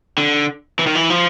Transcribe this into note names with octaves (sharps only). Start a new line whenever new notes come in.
D3
E3
D#3
E3
F3